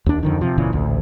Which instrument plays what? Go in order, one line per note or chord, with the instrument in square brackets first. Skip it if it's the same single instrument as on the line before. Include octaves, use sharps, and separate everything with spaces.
[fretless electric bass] D#2 D4
F2 D3 D#3
C3 F3
F#1 A#2 C#3 E3
A1 D2